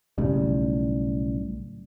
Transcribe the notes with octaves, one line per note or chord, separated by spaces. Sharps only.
B1 A2 C#3 G3